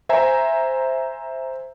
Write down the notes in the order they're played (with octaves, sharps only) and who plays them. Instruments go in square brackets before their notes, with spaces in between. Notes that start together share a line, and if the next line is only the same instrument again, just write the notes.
[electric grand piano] C5 E5 G#5 A#5